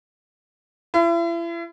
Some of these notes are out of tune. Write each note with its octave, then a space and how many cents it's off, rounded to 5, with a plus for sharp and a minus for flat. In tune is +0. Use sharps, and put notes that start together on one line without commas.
E4 +40